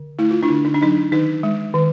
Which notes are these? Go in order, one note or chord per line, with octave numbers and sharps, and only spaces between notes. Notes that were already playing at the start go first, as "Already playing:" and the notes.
Already playing: D3
A3 E4
F4
D4 E4
D3
D#4
D4
F#3 D#4
D#3 D#4
G#3
D#3